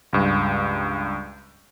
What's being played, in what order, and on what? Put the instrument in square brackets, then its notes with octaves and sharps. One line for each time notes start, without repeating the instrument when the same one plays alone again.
[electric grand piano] C#2 G2